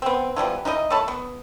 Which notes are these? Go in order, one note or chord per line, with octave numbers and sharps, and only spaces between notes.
B3 C4
E3 F3 G3 B3
D#4 E4 G#4 D#5
A3 C#5 A5 B5
B3